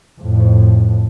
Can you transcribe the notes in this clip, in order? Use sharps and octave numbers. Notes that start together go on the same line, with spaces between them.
F2 A2